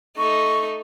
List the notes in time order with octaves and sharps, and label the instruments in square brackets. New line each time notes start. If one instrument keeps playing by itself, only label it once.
[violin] A3 D#4 [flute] C#6